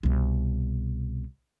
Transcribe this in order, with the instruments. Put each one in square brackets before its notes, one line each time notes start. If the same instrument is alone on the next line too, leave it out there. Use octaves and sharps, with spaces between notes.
[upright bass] C2 B2